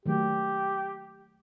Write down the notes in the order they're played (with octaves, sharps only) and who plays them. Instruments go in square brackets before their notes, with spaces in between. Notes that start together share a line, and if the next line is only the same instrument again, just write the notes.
[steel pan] D#3 F#3 A3 [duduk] G4